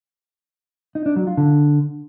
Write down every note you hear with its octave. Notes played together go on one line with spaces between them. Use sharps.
D#4
D4
F#3
F4
D3